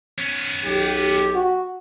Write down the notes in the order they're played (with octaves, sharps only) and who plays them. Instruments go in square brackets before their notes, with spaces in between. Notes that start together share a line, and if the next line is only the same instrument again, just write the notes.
[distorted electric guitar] B3 C#4
[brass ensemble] B1 G4
[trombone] F#4